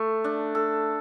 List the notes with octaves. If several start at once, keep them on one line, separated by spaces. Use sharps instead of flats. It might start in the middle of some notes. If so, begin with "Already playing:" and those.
Already playing: A3
D4
A4